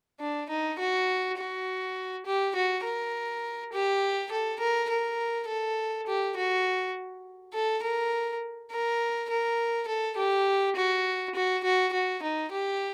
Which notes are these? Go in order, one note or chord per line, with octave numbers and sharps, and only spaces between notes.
D4
D#4
F#4
F#4
G4
F#4
A#4
G4
A4
A#4
A#4
A4
G4
F#4
A4
A#4
A#4
A#4
A4
G4
F#4
F#4
F#4
F#4
D#4
G4